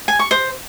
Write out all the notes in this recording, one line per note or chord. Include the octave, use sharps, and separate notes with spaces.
G#5
C#6
C5